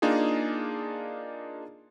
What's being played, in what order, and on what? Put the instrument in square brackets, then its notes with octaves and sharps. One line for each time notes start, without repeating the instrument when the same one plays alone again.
[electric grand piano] A#3 D4 D#4 F4 G#4